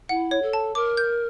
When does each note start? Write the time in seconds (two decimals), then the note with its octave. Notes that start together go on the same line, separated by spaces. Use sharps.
0.09 E4 F#5
0.31 C#5
0.42 A4
0.53 A5
0.75 A#4 D6
0.97 G6